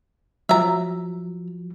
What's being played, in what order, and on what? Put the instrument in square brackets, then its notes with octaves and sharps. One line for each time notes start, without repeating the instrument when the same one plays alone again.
[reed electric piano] F3 F#3 [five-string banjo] E5 A#5